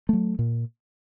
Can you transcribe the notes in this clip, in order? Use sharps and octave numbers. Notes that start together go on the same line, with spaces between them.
F#3 A3
A#2